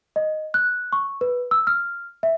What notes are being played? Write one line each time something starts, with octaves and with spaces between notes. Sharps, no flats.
D#5
F#6
C#6
B4
E6
F6
E5